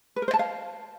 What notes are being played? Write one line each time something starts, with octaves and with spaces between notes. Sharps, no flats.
B4
A#4
C5
A5
F5